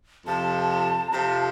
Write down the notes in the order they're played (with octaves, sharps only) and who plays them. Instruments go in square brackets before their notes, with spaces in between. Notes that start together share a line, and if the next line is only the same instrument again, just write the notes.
[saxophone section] F2 C3 F3 [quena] A5
[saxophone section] F2 C3 F3 [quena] A5 A#5